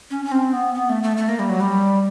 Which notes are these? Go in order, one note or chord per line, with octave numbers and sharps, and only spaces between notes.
C#4
C#4
C4
B3
B3
A3
A3
A3
A#3
G3
F#3
G3